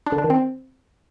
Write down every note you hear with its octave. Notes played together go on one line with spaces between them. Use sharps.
D4
D3
D4
D#3
C4